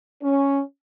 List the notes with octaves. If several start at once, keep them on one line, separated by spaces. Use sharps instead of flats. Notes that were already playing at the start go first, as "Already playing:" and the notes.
C#4